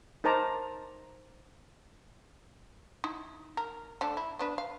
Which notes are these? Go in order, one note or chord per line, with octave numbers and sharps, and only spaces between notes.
D#4 A#4 C5 A5 A#5 D6
D#4 E4
A#4
D3 A3 D4
E4
B3 D4 B4
F5